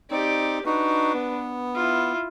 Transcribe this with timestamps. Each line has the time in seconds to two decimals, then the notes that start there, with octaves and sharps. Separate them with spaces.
0.11 C4 D#4 G4 D5
0.66 D4 D#4 F#4 B4
1.14 B3
1.75 E4 F4